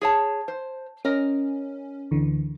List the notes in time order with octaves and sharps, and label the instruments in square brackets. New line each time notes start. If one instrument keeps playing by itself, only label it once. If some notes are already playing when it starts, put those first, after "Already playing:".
[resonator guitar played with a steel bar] G#4 C#5 A5
C5
[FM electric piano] C#4 [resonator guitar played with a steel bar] A#4 D#5
[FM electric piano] D2 D3 E3